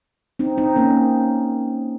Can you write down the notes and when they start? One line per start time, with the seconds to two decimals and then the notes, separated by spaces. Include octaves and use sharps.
0.39 C4 D#4
0.58 C4 D#4
0.76 A#3 C#4